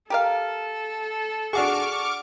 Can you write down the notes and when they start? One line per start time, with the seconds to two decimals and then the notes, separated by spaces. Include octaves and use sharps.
0.10 G4 A4 A#4 F5
1.53 D4 F#4 G#4 C#6 D6 F6